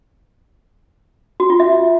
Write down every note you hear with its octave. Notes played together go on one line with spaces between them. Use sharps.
F#4
F4
E5